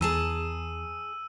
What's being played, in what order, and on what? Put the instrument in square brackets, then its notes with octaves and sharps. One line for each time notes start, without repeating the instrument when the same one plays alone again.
[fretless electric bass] E2 [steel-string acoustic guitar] G#4 A5 A#5 [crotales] E6 D#7